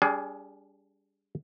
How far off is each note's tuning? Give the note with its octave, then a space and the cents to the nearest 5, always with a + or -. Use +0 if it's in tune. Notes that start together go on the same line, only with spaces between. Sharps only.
G3 +15 D4 -35 G#4 +20